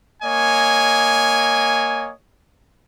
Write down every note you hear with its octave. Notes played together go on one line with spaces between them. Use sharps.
A#3 C#5 D#5 G#5